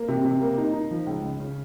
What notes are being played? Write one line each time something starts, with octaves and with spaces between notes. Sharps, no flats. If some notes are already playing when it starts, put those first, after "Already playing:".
Already playing: A#3
C3
C3
A#3
D#4
D#4
F3
C#2
C#3
C#3